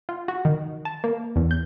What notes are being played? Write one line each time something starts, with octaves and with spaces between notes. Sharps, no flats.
F4
F#4
D#3
A5
A#3
E2
G6